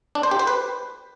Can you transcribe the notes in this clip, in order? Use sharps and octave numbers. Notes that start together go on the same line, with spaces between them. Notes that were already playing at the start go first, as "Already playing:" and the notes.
D4
C5
G4
C5
B4